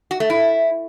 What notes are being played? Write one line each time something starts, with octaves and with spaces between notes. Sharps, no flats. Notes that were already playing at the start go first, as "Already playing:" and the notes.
F#4
A3
E4